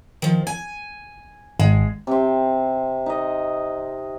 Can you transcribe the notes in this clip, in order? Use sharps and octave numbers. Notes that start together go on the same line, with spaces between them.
D#3 F3
G#5
G#1 G#3
C3 C4
D#4 D#5